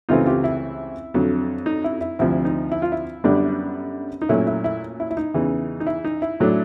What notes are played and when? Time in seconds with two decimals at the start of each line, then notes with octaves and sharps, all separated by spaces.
0.09 C#2 C3 E3 A3 C4 D#4 F4
0.26 F4 G4
0.44 E4
1.14 F2 D3 F#3
1.66 D#4
1.84 E4
2.01 E4
2.19 D2 C3 F3 E4
2.45 D#4
2.72 E4
2.82 F4
2.92 E4
3.24 F#2 D3 G3 B3 D4
4.22 D#4
4.29 A#2 F#3 A3 C#4 E4
4.47 E4
4.64 E4
5.00 E4
5.11 E4
5.17 D#4
5.34 E2 C#3 E3
5.80 D#4
5.87 E4
6.04 D#4
6.22 E4
6.40 A2 F#3 A3 D4